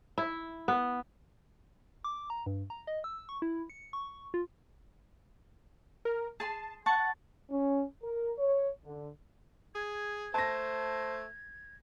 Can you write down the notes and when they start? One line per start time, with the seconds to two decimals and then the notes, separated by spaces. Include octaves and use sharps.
0.18 E4
0.68 B3
2.04 D6
2.30 A#5
2.46 G2
2.70 A#5
2.87 D#5
3.04 E6
3.29 C#6
3.42 E4
3.70 C#7
3.93 C#6
4.34 F4
6.05 A#4
6.40 G#4 A5 C6
6.86 F#5 A5 C#6
7.50 C#4
8.03 A#4
8.38 C#5
8.85 D3
9.75 G#4 G#6
10.34 A3 C5 A5 A#6